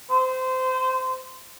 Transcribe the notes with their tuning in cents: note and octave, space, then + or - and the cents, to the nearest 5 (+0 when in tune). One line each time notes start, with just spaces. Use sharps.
C5 -25